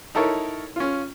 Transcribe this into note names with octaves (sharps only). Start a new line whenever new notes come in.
D#4 E4 A4 A#4 C#5
C#4 F4